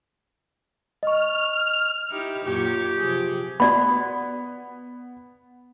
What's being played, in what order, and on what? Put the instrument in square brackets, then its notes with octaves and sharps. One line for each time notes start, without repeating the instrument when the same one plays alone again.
[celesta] D#5 C#6 [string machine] F6
[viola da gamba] D#4 E4 G4
[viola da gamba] F#2 A#2 C#5 [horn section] G4
[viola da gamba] C3 F3 G#4
[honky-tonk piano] B3 [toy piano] F#4 D5 B5